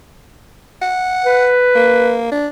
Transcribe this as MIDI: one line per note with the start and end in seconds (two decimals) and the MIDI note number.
0.82 1.54 78
1.26 2.19 71
1.75 2.30 58
2.31 2.47 62